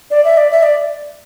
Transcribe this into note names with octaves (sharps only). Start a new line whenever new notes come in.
D5
E5
D5
E5
D5